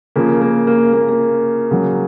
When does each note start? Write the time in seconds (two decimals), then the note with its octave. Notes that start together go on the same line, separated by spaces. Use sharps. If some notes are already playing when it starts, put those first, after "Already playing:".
0.16 C#3 F3 A#3
0.41 A#3
0.67 A#3
0.93 A#3
1.09 A#3
1.71 C#3 F#3